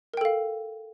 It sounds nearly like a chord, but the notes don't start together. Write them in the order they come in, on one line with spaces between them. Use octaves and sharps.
A#4 G5 A4 F5